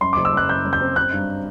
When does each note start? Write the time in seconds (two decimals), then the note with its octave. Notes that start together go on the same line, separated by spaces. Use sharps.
0.01 F#2 C6
0.13 F#1 D6
0.25 E6
0.33 F#2 F#6
0.48 F#2 G6
0.65 F#2
0.73 G6
0.81 C4
0.96 C4 F#6
1.13 G2